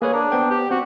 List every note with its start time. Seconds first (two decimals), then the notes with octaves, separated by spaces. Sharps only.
0.02 A#3 G#4 B4 C#5
0.14 D4 A#5
0.32 B3 C5 G5
0.50 G4
0.71 C4 F#4